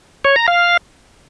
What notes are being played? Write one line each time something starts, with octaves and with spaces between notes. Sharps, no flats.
C#5
A#5
F5